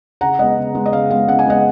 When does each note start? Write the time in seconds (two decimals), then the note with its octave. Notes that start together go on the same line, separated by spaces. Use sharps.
0.21 C#3 F#5 A#5
0.39 G#3 B3 D#5 F#5
0.57 C#3
0.75 G#3 B3
0.86 D#5
0.92 C#3 F5
1.10 G#3 B3 F5
1.28 C#3 F#5
1.39 G#5
1.46 G#3 B3 D#5 F#5